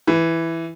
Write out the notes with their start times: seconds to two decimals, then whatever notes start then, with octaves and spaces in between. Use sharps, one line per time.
0.07 E3